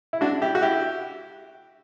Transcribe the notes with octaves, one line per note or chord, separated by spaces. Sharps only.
E4
D4 F#4
E4 G4
F#4
E4 G4